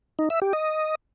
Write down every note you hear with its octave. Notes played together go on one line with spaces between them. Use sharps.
D#4
E5
G4
D#5